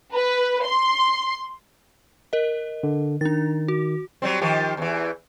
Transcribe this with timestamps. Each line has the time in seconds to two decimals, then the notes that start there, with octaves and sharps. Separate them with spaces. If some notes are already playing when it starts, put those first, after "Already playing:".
0.14 B4
0.64 C6
2.33 A#4 D#5
2.83 D3
3.21 D#3 D4 A6
3.68 F#4
4.22 F#3 G3 C4
4.41 D#3 F3 G4
4.77 E2 E3